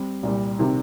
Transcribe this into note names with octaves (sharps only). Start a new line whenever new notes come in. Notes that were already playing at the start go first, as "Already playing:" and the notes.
Already playing: G3 C4
C2 A#2 G3
C3 D#3 C4